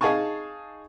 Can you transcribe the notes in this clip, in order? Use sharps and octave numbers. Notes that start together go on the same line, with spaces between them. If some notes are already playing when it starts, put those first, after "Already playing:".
D#4 G#4 F5 G#5 A5 C#6